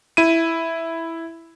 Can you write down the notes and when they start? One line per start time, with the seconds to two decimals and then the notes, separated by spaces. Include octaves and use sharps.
0.17 E4 D#7